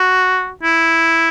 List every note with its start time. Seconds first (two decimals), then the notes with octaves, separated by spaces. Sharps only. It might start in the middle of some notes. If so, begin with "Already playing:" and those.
Already playing: F#4
0.63 E4